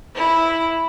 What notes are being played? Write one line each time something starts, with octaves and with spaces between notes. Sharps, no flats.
E4